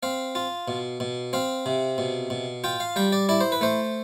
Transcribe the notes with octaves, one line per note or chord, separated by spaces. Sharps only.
C4 F5
F4
B2
B2
C4 F5
C3
B2
B2
F4 G5
F5
G3 G5
D5
E4 D5
C5
B4
A3 C5